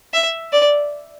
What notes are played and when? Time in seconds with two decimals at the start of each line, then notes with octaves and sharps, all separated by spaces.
0.14 E5
0.53 D5